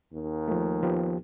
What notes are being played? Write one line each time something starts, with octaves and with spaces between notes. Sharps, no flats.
D#2
F3 A3
F3 B3 G4